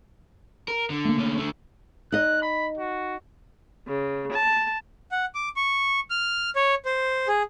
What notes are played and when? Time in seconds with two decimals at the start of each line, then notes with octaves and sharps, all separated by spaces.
0.68 A#4
0.90 D3
1.05 A3 A#3
1.18 D3 C#4
1.38 D3 A3
2.12 D#4 D#5 F#6
2.42 B5
2.78 F#4
3.88 C#3
4.32 A5
5.11 F#5
5.35 D6
5.56 C#6
6.10 F6
6.56 C#5
6.85 C5
7.28 G#4